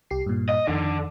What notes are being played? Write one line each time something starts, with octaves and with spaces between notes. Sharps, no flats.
C2 G4 C7
G2 A#2
D#5
F2 D3 D#3